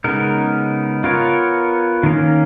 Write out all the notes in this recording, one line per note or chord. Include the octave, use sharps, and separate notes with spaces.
C#3 G#3 B3 D#4 A#4
B3 F4 A#4 C#5
D#3 A#3 C#4